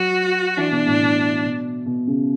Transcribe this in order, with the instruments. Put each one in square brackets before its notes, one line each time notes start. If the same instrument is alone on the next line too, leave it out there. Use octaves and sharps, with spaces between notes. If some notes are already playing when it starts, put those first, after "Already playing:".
Already playing: [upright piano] F#3 [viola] F#4
[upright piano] E3 [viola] D4
[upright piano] B2
A2
B2
B2
B2
C#3